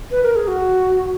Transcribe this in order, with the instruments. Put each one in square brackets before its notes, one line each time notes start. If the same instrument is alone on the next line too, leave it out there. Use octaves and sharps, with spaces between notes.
[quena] B4
A#4
G#4
F#4